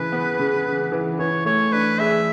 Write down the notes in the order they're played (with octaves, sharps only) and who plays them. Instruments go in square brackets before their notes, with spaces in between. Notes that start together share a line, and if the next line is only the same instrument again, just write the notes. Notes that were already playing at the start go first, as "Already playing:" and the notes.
Already playing: [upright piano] C#3 E3 [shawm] B4
[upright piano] B3
C#3
C#3
E3
[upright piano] E3 [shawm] C#5
[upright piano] A3 [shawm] C#5
[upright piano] D4 [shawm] B4
[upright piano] G#4 [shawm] E5